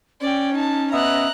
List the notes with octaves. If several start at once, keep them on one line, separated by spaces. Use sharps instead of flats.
C#4 D5 G5
D#4 A5
B3 D#5 E5 A#5 F#6